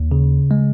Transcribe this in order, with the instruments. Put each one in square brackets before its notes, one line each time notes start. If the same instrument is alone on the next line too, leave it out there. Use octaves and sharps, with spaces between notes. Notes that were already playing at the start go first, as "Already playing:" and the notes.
Already playing: [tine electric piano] D#2
C#3
G#3